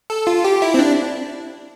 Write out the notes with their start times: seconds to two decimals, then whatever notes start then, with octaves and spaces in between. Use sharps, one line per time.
0.10 A4
0.27 F4
0.44 G4
0.62 E4
0.74 C4
0.79 D4